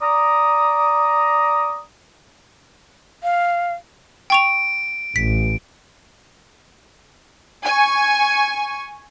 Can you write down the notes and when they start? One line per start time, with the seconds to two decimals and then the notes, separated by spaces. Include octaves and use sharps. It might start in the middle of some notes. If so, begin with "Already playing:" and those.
0.01 D5 A#5 D#6
3.23 F5
4.30 G5 C#6 D7 F7
5.16 A1 B6
7.66 G#5 C#6